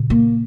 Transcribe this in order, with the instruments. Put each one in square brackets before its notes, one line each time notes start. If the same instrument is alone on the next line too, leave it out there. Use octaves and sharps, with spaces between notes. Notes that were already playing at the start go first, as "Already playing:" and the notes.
Already playing: [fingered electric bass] A#2 C#3
[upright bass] A#3